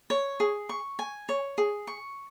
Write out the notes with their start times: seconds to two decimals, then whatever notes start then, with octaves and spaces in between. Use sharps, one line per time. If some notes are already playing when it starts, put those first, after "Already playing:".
0.10 C#5
0.40 G#4
0.69 C#6
0.99 G#5
1.29 C#5
1.58 G#4
1.87 C#6